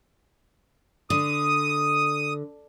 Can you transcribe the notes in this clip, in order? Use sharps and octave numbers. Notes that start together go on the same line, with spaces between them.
D3 D#6